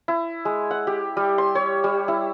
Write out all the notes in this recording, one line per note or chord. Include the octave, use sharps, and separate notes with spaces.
E4
G#3
F#5
G4
G3
C6
C#5
G3
E4